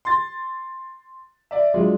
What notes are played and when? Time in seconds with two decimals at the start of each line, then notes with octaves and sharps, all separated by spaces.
0.05 C6 A6
1.51 D5 E5
1.74 F#3 G#3 D4 F4